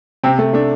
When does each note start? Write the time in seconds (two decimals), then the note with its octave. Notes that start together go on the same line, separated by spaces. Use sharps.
0.23 C3 C4
0.38 C3 A3
0.53 A3 D4